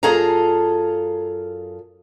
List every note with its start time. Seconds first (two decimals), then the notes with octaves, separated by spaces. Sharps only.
0.03 F#2 F4 G#4 A4 F5 A#5